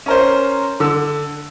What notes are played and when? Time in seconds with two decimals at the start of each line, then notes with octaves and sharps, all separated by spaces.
0.06 C#4 A#4 C5
0.80 D3 E6